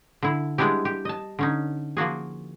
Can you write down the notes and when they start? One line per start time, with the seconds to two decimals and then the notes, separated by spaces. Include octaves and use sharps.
0.22 D3 E4
0.58 G3 G#3 B3 D4 E4 G4
0.85 G4
1.05 D#5 A5
1.39 D3 C#4 D#4
1.97 F3 A#3 F#4 G#4